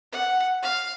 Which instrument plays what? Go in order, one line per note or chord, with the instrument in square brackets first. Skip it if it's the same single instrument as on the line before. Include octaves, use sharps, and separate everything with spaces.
[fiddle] F#5
F5